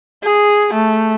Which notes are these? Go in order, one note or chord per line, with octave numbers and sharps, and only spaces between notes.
G#4
A3